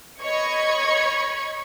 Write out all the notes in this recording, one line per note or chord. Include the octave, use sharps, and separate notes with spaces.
C#5 D#5 B5 C#6 G#6 C#7